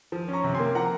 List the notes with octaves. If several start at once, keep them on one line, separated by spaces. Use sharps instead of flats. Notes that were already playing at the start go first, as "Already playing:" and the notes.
F3
C#4
A#5 C#6
C3
G#5 C6
A#3
F3 F#5 A#5